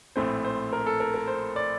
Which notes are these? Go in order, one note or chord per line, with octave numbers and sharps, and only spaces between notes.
A#1 A2 A3 C4 C5
C5
A#4
A4
A#4
A#4
C5
D5